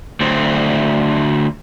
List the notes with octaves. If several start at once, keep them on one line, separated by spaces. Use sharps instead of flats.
D2 C4